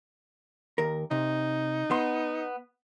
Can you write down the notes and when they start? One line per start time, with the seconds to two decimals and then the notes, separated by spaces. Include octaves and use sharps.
0.78 D#2 A#4
1.11 C3 D#4
1.91 B3 C6